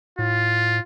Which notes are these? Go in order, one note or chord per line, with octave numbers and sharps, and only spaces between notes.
A2 F4